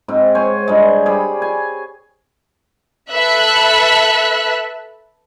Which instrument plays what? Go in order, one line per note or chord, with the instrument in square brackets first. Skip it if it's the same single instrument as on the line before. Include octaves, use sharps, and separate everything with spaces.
[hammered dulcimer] G#2 C4
C5 C#5 G#5
G2 G#3
G3 G#4 B5
G#5
[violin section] A4 B4 E5 F#6